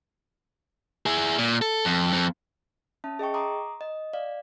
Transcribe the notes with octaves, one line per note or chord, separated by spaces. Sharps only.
E4 G#4
A#2
A4
F2
F2
C#4 E5 A5
G#4 D#5 G5 C#6
A#5 C6 D6 D#6
D#5
D5 F5